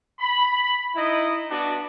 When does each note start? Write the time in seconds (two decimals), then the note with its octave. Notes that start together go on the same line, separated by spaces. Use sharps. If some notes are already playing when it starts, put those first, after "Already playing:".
0.19 B5
0.95 D#4 E4 D#5
1.50 B3 D4 F#4